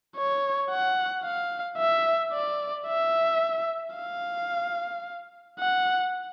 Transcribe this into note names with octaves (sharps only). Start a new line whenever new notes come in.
C#5
F#5
F5
E5
D5
E5
F5
F#5